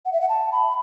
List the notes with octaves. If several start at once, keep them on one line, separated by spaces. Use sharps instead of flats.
F#5
E5
F#5
A5
B5